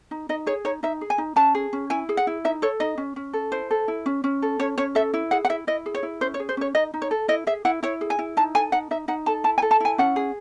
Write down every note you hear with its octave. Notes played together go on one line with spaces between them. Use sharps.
D#4
D#4 D#5
G#4 C#5
D#4 C#5
D#4 E5
G#4
G#5
D#4
C#4 A5
G#4
C#4
E4 G#5
G#4
F#5
E4
D#4 E5
A4 C#5
D#4 D#5
C#4
C#4
A4
E4 C5
A4
E4
C#4
C#4
A4
C#4 C#5
C#4 C#5
A4 E5
E4
G#4 F#5
F#5
E4 E5
E4 D#5
G#4
C#5
E4
C#4 C5
C#5
G#4
C5
C#4 C#5
D#4 D#5
D#4
C#5
A4
E4 D#5
G#4 E5
E4 F#5
E4 C#5
G#4
G#5
E4
D#4 A5
A4 G#5
D#4 F#5
D#4 E5
D#4 F#5
A4 A5
E4 A5
G#5
A4
A5
E4 G#5
C#4 F#5
G#4